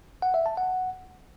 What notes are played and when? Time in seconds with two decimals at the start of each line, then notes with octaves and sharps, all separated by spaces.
0.22 F#5
0.34 E5
0.46 A5
0.57 F#5